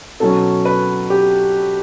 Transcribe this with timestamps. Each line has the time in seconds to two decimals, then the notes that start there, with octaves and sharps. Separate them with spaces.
0.20 B2 F#3 C#4 A4
0.65 B4
1.10 G4